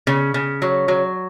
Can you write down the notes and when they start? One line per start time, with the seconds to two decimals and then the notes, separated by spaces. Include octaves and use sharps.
0.07 C#3
0.34 C#3
0.62 F#3
0.88 F#3